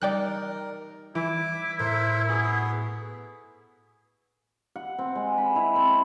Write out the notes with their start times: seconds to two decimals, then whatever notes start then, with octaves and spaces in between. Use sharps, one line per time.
0.02 G3 D#4 A#4 D5 G5 F#6
1.15 E3 E4 D6
1.79 A2 A#4 C5 E5
2.29 B3 F#4 G#4
4.76 F#5
4.99 C4
5.15 G#3
5.38 B5
5.56 E4
5.76 C4